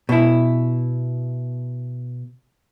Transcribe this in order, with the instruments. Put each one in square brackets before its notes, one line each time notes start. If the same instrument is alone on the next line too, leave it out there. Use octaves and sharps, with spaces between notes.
[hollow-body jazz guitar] B2 E4